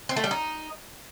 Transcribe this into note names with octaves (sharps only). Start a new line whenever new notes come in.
C4
A3
G3
D#4